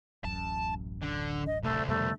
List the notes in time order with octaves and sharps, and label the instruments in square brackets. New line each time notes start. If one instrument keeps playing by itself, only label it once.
[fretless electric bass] D1 A1 F#2 [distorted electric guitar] A5
[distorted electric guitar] D3
[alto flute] D#5
[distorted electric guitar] C2 D3 [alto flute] A3
[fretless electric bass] F2 B2 G3 [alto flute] A3